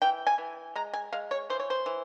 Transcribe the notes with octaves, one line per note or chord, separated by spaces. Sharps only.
E3 G5
G#5
E3
G#3 A#5
G#5
G#3 F5
C#5
E3 C5
C#5
C5
E3